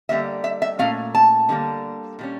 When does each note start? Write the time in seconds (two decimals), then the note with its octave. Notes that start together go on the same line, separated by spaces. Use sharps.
0.09 D3 G3 A#3 E5
0.44 E5
0.62 E5
0.79 A#2 A3 C#4 F5
1.15 A5
1.49 D3 G3 A#3
2.19 A#2 G3 C#4